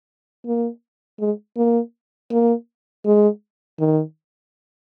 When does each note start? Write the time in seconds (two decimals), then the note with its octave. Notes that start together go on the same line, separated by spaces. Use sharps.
0.46 A#3
1.20 G#3
1.57 A#3
2.31 A#3
3.06 G#3
3.79 D#3